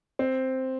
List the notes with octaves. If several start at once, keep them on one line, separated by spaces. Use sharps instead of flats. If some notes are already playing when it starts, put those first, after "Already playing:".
C4